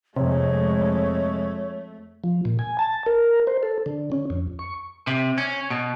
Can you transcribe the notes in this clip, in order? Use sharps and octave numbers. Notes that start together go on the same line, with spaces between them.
F2 C3 G#3 A3 C#5
F3
A#2
G#5
A5
A#4
C5
A4
D3
C#4
F2
C#6
C3
C#4
B2